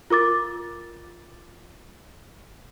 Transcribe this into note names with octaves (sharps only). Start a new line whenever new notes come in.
F4 A#4 D6 A6